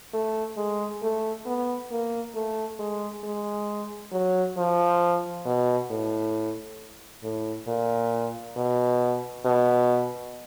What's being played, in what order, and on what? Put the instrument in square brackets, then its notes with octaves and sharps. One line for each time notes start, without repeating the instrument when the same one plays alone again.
[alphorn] A3
G#3
A3
B3
A#3
A3
G#3
G#3
F#3
F3
B2
A2
A2
A#2
B2
B2